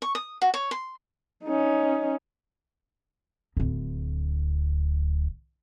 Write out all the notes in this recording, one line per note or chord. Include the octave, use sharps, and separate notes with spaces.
C#6
D#6
F#4
C#5
C6
C#4 D#4
D1 D2